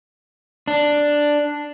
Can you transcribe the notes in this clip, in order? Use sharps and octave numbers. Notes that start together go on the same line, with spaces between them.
D4